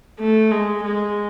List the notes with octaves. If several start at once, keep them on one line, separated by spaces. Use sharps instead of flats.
A3
G#3
G#3